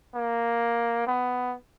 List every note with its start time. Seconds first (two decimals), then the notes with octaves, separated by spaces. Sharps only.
0.15 A#3
1.07 B3